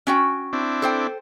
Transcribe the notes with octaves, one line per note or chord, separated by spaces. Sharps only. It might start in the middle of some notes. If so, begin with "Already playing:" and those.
C#4 F#4 G5
C4 D4 E4
A4 C5 G5